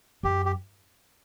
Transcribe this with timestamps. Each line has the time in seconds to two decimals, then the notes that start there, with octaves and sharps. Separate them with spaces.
0.23 F#2 G4
0.46 G4